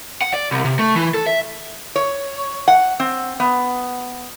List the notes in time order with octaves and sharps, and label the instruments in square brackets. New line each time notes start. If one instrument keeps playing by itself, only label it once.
[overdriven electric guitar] F#5
D5
C2
C3
A3
E3
A4
E5
[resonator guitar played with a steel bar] C#5
F#5
C4
B3